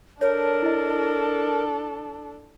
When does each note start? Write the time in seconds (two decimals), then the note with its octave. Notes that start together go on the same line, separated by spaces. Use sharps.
0.21 D4 A4 A#4 C#5
0.62 E4 D#5